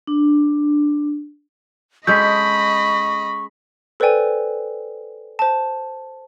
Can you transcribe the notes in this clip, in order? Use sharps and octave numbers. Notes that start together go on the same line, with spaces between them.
D4
G#3 C#4 A4 D#5 B5 C#6 G6 B6
A4 B4 C5 D5 G5 G#5
C5 A5